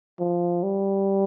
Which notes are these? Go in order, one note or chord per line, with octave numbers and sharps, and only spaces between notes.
F3
G3